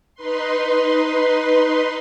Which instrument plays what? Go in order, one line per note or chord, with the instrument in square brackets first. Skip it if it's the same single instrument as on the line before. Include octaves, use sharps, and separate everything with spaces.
[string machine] D#4 B4 C6